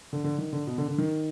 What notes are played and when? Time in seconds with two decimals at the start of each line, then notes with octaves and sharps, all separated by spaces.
0.13 D3
0.24 D3
0.38 D#3
0.52 D3
0.67 B2
0.78 D3
0.88 D3
0.98 D#3